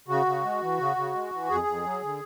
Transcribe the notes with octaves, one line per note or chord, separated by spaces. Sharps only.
C#3 F#4
C#3
G#3
E3
C#3
C#3
G#3
E3
F2 G#4
F2
F#3
D3